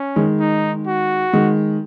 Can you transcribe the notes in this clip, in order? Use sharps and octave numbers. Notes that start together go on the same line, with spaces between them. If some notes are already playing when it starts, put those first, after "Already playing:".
Already playing: C#4
D#3 G#3
D#4
F#4
D#3 G#3